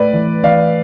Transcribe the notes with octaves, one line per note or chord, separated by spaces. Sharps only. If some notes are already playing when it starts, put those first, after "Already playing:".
Already playing: A2 B4 D5
E3
E3 D5 F5